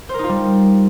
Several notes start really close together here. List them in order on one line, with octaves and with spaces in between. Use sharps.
C5 A#4 D#4 F4 G3